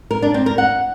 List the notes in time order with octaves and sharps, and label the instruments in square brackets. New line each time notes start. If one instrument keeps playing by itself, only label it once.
[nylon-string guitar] A#4
D4
C4
A#4
F#5